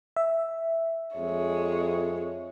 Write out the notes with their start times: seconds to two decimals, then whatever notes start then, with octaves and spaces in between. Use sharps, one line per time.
0.16 E5
1.17 F2 G#3 C#5